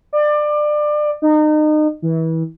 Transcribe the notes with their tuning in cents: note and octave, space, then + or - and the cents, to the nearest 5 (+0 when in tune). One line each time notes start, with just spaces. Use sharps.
D5 +25
D#4 -30
E3 -25